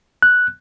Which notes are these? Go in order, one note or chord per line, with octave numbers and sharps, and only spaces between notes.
F#6